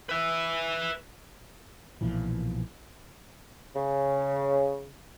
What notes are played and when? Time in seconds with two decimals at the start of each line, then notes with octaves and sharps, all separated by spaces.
0.09 B4 E5
2.01 B1 A#2 E3 F3
3.76 C#3